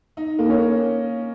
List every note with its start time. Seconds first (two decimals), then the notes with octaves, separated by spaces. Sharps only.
0.17 D#4
0.39 A#3
0.49 C#4